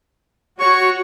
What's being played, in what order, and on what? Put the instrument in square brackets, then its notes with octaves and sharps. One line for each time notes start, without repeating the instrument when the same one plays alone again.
[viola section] F#4 [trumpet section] C#5 [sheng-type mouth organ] C#6